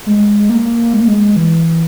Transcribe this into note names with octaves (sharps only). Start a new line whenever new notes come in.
G#3
A#3
G#3
A#3
G#3
E3